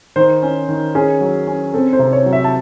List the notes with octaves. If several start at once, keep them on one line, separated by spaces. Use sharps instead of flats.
D#3 C5
C#4
D#3
C#4 G#4
F#3
C#4
C4 A4
C5
C3
C#5
F#3
E5
A5